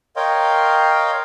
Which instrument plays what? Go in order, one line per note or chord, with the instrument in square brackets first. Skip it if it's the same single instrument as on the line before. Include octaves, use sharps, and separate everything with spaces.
[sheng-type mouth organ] A#4 C#5 D#5 F5 G5 C6